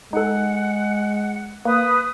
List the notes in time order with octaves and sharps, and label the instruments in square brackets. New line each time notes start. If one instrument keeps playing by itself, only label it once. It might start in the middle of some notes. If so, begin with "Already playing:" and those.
[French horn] G#3 [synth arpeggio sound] D#4 A4 [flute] F#5
[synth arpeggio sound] A#3 [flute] B4 [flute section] D#6